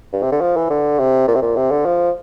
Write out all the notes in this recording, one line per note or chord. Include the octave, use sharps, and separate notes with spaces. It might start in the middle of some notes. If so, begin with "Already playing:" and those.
G2
C3
D3
F3
E3
D3
C3
A#2
C3
A#2
C3
D3
F3